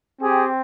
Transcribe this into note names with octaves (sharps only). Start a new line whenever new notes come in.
C4 G4 G#4